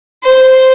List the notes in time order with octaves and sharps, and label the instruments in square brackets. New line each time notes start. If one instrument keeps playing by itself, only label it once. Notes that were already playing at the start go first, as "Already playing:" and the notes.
[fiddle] C5